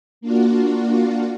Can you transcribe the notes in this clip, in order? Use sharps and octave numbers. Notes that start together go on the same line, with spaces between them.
A#3 D4 F4 F#4